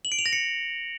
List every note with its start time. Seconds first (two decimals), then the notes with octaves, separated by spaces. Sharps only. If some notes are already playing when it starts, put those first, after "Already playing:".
0.05 F#7
0.12 D7
0.19 F7
0.26 A#6
0.33 C#7